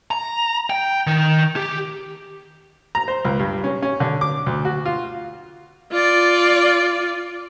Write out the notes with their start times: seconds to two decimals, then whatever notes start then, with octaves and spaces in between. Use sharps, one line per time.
0.11 A#5
0.70 G5
1.07 D#3
1.56 G4
2.95 A#5
3.08 C5
3.25 C#2
3.39 G2
3.64 C#4
3.82 C#4
4.00 D3
4.21 D6
4.46 D2
4.65 F#4
4.85 F4
5.92 F4 D5